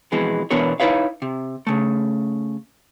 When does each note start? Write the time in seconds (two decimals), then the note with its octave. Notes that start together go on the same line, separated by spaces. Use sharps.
0.12 F2 B2 E3 G#3
0.51 B2 E3 B3 D4 A#4 C#5
0.80 D#4 E4 B4 C#5 F5
1.22 C3
1.67 C#3 A3